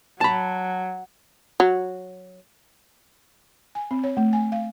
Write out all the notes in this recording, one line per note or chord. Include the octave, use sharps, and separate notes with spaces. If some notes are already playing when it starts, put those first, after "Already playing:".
F#3 A5 B5
F#3
G#5
C4
C#5
A3
G#5
F5